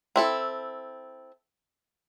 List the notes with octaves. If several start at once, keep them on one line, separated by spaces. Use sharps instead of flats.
C4 E4 A4